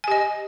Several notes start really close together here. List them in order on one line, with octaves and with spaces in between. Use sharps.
G#5 G4 D#5